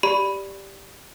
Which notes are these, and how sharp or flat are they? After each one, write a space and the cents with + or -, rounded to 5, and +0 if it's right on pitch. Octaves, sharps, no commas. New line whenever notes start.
G4 +0 D5 -5 B5 +0